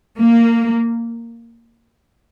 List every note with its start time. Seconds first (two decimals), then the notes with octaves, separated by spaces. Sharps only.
0.17 A#3